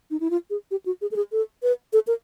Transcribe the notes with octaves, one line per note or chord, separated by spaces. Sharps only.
D#4
E4
F4
G#4
G4
F#4
G#4
A4
G#4
A4
B4
A4
A#4